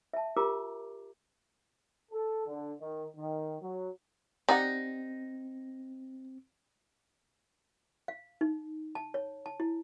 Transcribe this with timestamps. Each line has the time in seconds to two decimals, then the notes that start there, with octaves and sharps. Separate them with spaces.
0.14 E5 A5
0.36 F4 G4 A#4 A#5 D6
2.12 A4
2.47 D3
2.80 D#3
3.17 D#3
3.62 F#3
4.49 C4 D#4 G4 D5 F#5
8.08 F5
8.41 D#4
8.95 A5
9.14 C#5
9.46 A5
9.60 E4